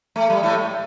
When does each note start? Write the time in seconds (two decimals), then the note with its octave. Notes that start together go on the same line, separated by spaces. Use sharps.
0.16 A3
0.30 G3
0.43 A2 A3